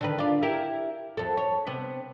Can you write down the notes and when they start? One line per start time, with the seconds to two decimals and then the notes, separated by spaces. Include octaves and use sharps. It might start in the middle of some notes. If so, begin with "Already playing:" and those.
0.01 D3 D#3 B4
0.18 F4 D5
0.43 E4 G4 A#4
1.17 F2 A4
1.37 C#5
1.67 C3 B3